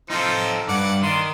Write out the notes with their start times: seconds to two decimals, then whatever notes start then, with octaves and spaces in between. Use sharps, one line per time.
0.10 F3 C4 D#4 A4
0.69 G2 F#5 D6
1.02 D#3 D5 C6